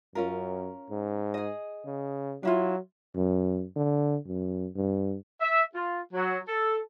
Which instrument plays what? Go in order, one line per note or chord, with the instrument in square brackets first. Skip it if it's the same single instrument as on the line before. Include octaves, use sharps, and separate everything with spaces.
[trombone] F#2 [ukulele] C#4 F4 A#4
[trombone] G#2
[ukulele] G#4 D#5
[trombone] C#3
[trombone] F#3 [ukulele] D4 E4 F4
[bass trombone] F#2
D3
F#2
G2
[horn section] E5
F4
F#3
A4